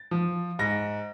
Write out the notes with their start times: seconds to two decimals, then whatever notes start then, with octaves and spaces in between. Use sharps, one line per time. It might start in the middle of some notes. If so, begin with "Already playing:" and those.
Already playing: A6
0.11 F3
0.59 G#2 A#6